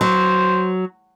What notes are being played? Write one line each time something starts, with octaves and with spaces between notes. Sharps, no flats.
F#3 C5